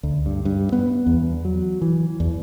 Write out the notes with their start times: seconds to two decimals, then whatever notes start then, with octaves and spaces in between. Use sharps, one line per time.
0.03 D2
0.26 G2
0.45 G2
0.72 B3
1.06 E2
1.45 F#3
1.81 E3
2.20 E2